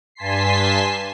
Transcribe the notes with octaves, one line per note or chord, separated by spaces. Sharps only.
G2 G#5 A5 C6 B6 C7